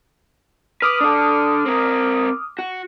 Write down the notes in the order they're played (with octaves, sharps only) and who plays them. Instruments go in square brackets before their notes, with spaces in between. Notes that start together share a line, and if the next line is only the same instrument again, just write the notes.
[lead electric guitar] B4 [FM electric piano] D6 D#6 F6
[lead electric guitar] D4 A4
C4 A#4
F#4